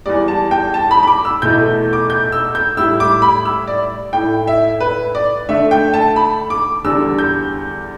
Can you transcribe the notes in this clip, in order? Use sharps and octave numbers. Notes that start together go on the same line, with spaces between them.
E2 E3 G3 D5
A5
G5
A5
B5
B5
D6
E6
E2 B2 A3 E4 G6
D6
G6
E6
G6
A2 G3 E4 E6
D6
B5
E6
D5
A2 A3 E4 G5
E5
B4
D5
D3 A3 D4 E5
G5
A5
B5
D6
E2 D3 G3 D4 E6
G6